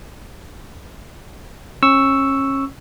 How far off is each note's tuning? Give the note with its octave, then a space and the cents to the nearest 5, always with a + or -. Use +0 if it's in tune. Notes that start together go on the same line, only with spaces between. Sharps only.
C#4 -30 C#6 +0 E6 +0